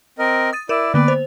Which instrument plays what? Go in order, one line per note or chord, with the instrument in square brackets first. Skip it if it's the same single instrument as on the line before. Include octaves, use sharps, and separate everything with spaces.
[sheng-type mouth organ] C4 A#4 D#5
[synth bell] D#6 A6 D#7
[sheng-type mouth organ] E4 D5 [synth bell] A#4 D7 E7
[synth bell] D3 A#3 B3 [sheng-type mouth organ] B4 D5
[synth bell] C5